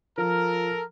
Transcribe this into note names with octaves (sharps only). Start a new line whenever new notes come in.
F3 A4 A#4